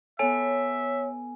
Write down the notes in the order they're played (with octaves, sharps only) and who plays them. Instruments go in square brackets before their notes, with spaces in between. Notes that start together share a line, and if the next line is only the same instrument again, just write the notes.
[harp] B3 A4 [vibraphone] C#5 [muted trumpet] E5 [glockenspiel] G#5